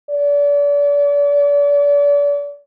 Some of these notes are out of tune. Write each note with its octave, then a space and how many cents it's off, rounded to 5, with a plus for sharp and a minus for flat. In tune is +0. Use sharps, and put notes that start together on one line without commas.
D5 -35